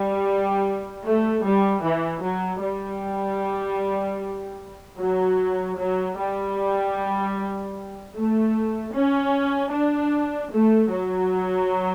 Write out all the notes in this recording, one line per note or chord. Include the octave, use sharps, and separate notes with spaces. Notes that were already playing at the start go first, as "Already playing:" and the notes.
Already playing: G3
A3
G3
E3
F#3
G3
F#3
F#3
G3
A3
C#4
D4
A3
F#3